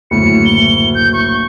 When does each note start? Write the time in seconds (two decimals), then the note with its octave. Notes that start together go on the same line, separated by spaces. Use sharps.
0.11 F#1 D2 A2 C#7
0.46 G7
0.95 G6
1.13 C#6